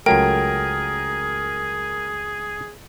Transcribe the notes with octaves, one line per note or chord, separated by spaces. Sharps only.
C#2 F#3 A3 G#4 A#4 G5